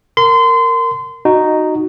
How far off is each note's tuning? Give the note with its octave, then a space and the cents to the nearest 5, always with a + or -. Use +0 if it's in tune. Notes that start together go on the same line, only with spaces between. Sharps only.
A#4 -15 C6 -30
D#4 -5 F#4 +0